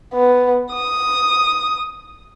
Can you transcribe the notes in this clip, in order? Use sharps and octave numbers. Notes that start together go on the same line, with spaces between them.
B3
D#6